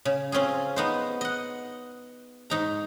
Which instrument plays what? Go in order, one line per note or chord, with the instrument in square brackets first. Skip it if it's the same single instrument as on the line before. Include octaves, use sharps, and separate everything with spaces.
[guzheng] C#3
C4 C#4 F4 G#4
B3 D#4 C5
D#5 F#5
G#2 D#4 A#5